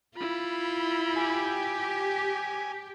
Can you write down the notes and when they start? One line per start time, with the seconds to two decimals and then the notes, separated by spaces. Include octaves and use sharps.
0.16 E4 F4 B5
1.16 G4 G#5